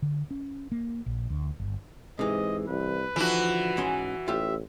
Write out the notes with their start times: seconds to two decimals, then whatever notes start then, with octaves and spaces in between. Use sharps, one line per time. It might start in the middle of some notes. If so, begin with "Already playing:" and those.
0.02 D3
0.31 C#4
0.72 A#3
1.06 A#1
1.30 D2
1.60 G1
2.19 G#2 C3 E3 D#5
2.68 C2 B4
3.16 D3 E3 F3 D#4 F#4 A4
3.77 G#2 C#4 C6
4.28 A1 F4 G4 E5